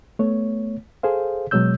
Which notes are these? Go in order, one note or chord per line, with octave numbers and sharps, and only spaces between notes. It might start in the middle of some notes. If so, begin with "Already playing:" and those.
A3 B3 C#5
G#4 A4 C5 F5
B2 F#3 G#3 C#5 E6 G6